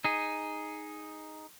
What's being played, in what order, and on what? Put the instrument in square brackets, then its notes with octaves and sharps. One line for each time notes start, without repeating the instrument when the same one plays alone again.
[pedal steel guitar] D#4 G#4